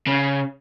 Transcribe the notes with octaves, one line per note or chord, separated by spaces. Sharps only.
C#3